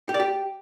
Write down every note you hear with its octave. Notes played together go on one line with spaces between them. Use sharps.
G4
D5
G4